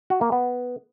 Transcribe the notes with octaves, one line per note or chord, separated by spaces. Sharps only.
F#4
A#3
B3